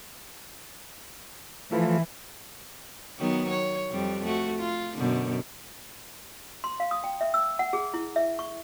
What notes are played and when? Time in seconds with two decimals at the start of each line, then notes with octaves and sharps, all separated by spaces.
1.72 E3 F3 A3
3.19 D#3 F#3 B3
3.51 C#5
3.90 F2 G3
4.25 A3 F#4
4.60 F4
4.97 F#2 B2 D3
6.64 C6
6.80 F5
6.91 D#6
7.04 G5
7.21 E5
7.34 E6
7.59 F#5
7.73 G#4
7.94 E4
8.16 E5
8.39 C#6